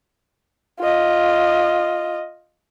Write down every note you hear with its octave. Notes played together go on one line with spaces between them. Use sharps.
F4 D#5